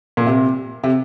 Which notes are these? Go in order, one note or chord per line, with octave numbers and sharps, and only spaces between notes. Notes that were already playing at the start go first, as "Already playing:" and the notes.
A#2
C3
C3